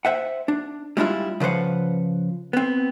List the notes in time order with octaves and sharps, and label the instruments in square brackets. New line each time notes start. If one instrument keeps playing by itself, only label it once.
[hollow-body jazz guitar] C5 E5 F#5
D4
G3 G#3 D4 E4 F4
C#3 F3 B4 C5 F#5
B3 C4